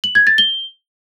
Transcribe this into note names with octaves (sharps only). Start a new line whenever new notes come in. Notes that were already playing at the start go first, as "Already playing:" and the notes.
F#7
G#6
A6
G7